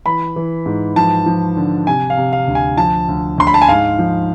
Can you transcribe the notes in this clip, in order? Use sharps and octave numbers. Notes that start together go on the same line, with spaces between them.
E3 B5
E3
G#2
F3 A5
F3
D3
C3 G#5
F5
C3
F5
D2
G#5
F3 A5
D2
D2 C6
B5
A5
G#5
G#2 F5
F3